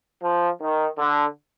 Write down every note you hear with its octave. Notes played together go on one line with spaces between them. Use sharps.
F3
D#3
D3